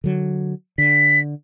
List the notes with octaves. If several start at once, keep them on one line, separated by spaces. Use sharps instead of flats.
D3 F#3
D3 B6